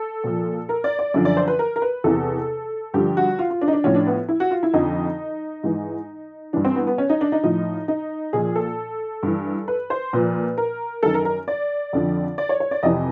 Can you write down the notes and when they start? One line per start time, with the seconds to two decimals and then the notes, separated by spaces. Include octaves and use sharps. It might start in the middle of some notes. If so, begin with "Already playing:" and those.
Already playing: A4
0.24 A#2 F3
0.69 A#4
0.84 D5
0.99 D5
1.14 F#2 D3 F3 D5
1.25 D5
1.37 C5
1.48 B4
1.59 A#4
1.76 A#4
1.82 B4
2.04 E2 C3 E3 A4
2.94 G2 D3 F3 G4
3.17 F#4
3.39 F4
3.50 F4
3.61 D4
3.68 D#4
3.73 D4
3.84 A2 F3 C#4
3.95 D4
4.07 B3
4.29 E4
4.40 F#4
4.51 F4
4.63 E4
4.74 F2 D3 F3 D#4
5.63 G#2 E3
6.53 G2 E3 D4
6.65 C4
6.76 B3
6.87 B3
6.98 C#4
7.10 D#4
7.21 D4
7.32 D#4
7.44 A2 F3 D#4
7.88 D#4
8.33 A#2 F3 G#4
8.56 A4
9.23 G2 E3
9.68 B4
9.90 C5
10.13 A#2 F3 B4
10.58 A#4
11.03 F#2 D#3 A4
11.14 A#4
11.25 A#4
11.48 D5
11.93 F2 D3 F3
12.38 D5
12.49 C#5
12.60 C#5
12.71 D5
12.83 F2 C3 E3 D#5